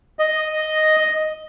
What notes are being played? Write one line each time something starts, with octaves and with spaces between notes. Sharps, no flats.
D#5